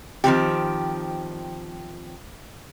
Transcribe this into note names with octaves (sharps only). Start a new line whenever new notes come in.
D#3 F3 C4 G4